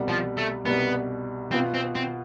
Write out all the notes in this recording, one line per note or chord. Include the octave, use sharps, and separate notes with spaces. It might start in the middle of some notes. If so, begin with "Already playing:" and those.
Already playing: C2 B2 G3
F3
A3
C2 B2 G3 B3
B2 B3 C4 F4
C4
C4